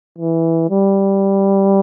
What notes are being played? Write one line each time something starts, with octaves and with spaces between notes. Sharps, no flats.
E3
G3